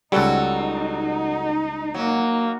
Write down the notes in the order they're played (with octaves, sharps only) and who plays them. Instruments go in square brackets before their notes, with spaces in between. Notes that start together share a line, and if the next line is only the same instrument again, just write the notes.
[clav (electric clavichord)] C#2 G3 [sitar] F#3 F#4 A4 [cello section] D#4
[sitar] F#3 [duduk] A#3